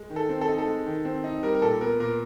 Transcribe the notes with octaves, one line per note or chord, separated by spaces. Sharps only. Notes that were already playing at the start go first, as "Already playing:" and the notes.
Already playing: G#3
D#3
A4
C4
A4
D#4
A4
G#3
D#3
C4
D#4
G3 A#4
A#4
A#2 A4
B3 A#4
A#2 A#4